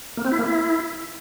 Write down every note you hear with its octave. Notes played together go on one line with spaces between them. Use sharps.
A#3
C4
E4
A#3
E4